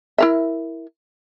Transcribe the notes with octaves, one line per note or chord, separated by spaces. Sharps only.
E4 A#4 E5